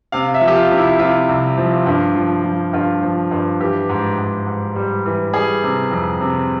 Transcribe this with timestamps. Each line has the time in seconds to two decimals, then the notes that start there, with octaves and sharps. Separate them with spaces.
0.12 C3 F5
0.34 E5
0.41 F3
0.48 G4
0.56 F4
0.71 C3
0.77 E4
0.99 C3 F4
1.28 C2
1.58 F3
1.86 G2
2.15 F3
2.44 F3
2.73 G2 F4
3.02 F3
3.31 G2
3.60 E3 G4
3.89 G#2
4.18 G#2
4.46 G#2
4.76 G3
5.05 E3
5.33 G3 G#4
5.63 C3
5.91 F2
6.21 C3